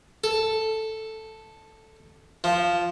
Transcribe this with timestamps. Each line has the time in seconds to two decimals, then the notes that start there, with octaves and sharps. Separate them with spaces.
0.24 A4
2.44 F3